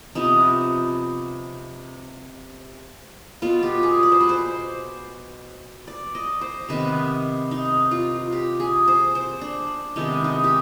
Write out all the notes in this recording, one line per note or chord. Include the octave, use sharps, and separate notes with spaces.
C3 F3 B3 D#4
B2 B3 F4
G4
G#4
D5
C5
B4
C5
D5
D#5
C5
C3 D#3 B3 B4
D#4
F4
G4
G#4
C5
C5
D4
C3 D#3 G#3 B3 D#4
D#4
G4